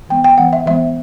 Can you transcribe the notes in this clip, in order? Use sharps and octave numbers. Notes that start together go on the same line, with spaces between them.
E3 G#3 B3 G5
G5
E3 G#3 B3 F#5
E5
E3 G#3 B3 E5